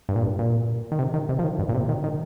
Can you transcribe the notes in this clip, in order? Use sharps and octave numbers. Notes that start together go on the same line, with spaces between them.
G2
A#2
G2
A#2
D#3
C3
D#3
C3
F3
D#3
G2
A#2
C3
A#2
D#3
D#3